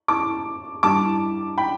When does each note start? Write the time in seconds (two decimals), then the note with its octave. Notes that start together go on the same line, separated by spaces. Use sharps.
0.08 A5 D6
0.83 G2 G3 E4 A5 D6
1.58 G5 B5